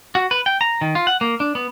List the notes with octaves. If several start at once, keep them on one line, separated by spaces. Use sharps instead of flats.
F#4
B4
G5
A#5
D#3
F4
F#5
A#3
D4
B3